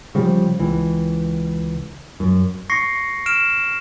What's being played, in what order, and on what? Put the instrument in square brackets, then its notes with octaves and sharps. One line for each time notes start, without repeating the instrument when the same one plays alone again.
[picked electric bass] C#3 F3 G3
C#2 E3
F#2
[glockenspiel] C#6 A#6 C7 C#7
F6 D7 E7